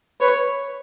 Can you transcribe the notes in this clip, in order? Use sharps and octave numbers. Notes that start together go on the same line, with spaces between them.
B4 C#5